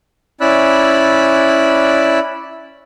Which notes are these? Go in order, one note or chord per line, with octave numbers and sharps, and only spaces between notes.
C#4 E4 D5 B5 E6 F#6